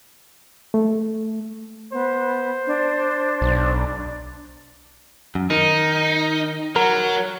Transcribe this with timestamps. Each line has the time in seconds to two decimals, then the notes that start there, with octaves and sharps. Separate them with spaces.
0.74 A3
1.93 B3 C5
2.67 D4
3.41 B1
5.35 F#2
5.50 D#3 D#4
6.76 F#3 A#4